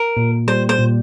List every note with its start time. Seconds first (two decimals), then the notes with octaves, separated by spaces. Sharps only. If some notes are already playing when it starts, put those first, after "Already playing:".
Already playing: A#4
0.17 A#2
0.48 G3 C5
0.69 C5
0.79 A#2